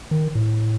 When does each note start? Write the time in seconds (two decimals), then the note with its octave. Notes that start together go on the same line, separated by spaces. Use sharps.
0.11 D#3
0.35 A2